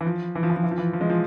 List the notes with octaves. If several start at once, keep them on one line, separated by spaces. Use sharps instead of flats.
E3
F3
E3
F3
E3
F3
E3
F3
E3
F3
G#3
F3